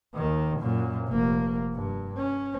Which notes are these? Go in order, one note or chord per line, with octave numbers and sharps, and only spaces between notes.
D#2 D#3
F#2 A#2
F1 A#3
G2
C#4